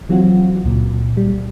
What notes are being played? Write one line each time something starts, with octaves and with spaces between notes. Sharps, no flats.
E3 F#3 C4 F4 F#4
C#2 A#2
G3